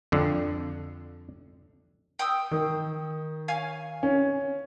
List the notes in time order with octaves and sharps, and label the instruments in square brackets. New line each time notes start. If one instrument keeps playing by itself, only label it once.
[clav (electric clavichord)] F2 D3
[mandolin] G5 D#6 E6
[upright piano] D#3
[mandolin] C#5 F5 G#5
[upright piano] C#4